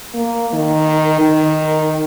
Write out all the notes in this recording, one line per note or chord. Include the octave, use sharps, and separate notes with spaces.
A#3
D#3
D#3